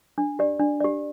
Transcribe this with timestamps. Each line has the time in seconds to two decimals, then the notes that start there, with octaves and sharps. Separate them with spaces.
0.18 D4
0.39 G4 D5
0.60 D4
0.81 G4 D5